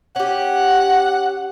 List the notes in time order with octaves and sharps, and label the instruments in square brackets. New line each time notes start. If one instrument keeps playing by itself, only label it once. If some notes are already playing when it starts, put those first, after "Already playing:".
[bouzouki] C#4 G4 [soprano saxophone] F#5